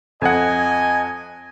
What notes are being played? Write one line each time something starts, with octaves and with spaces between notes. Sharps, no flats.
F2 D#5 F#5 G#5